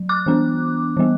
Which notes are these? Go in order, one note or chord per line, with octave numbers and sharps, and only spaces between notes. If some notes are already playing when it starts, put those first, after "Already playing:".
Already playing: F#3
D6 F#6
E3 B3 D4
E3 G3 B3